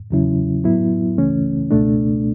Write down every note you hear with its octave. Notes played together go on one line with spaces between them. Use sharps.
E2 C#3 F#3 C#4 E4
A2 F#3 B3 E4
C#2 C#3 E3 A3 C#4
C#2 B2 A3 D4